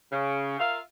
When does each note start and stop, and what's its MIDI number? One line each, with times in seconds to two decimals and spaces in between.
0.12 0.59 49
0.59 0.79 65
0.59 0.79 70
0.59 0.79 76
0.59 0.79 77